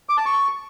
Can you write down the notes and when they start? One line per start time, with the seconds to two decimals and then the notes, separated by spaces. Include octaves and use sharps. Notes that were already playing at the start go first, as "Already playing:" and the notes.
0.09 D6
0.17 A5
0.26 C#6